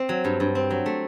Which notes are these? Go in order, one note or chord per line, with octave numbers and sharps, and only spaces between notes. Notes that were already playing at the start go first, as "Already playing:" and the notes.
Already playing: C4
F#3
G2
G2
C4
F#3
A3